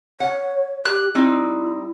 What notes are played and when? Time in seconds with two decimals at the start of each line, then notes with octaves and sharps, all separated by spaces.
0.20 C#5 F#5
0.85 G4 F#6
1.15 G3 C4 D#4 E4